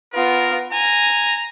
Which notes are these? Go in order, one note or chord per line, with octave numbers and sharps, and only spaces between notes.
B3 F4 A#4
G#5 A#5